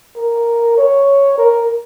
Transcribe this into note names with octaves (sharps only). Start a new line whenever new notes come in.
A#4
C#5
A#4